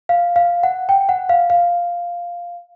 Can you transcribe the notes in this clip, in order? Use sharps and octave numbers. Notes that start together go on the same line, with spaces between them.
F5
F5
F#5
G5
F#5
F5
F5